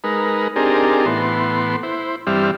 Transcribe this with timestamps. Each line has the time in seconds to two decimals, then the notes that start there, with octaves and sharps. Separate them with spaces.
0.04 G#3 D#4 A#4 B4
0.56 C4 D4 D#4 G4 G#4 A#4
1.06 A2 E3 B3 C6
1.83 E4 C5
2.27 G2 E3 G3 C4 E5 F6